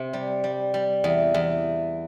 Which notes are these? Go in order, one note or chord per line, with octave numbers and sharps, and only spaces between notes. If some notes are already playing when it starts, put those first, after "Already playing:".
Already playing: C3
G3
G3
G3
E2
E2